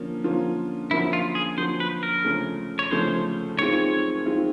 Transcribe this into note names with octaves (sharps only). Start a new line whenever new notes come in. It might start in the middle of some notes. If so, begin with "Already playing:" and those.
Already playing: D3 F3 A#3 C#4
D3 F3 A#3 C#4 F4
D3 F3 A#3 C#4 E4 F#4
F4
G#4
D3 F3 A#3 C#4 F#4 C5
B4
A#4
D2 C#3 F3 A3 C#4
C#5
D2 C#3 F3 A3 C#4 C5
F#2 D#3 G#3 C4 F4 C#5
C#5
F#2 D#3 G#3 C4 F4